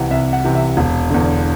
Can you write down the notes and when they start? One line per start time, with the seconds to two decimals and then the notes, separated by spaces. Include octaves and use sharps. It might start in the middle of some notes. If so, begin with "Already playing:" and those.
Already playing: C2 C3 E3 F#5
0.11 C2 E5
0.33 F#5
0.44 C3 E3
0.55 E5
0.77 E1
1.11 E2 D3